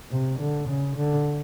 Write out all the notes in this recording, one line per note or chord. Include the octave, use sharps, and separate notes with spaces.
C3
D3
C#3
D3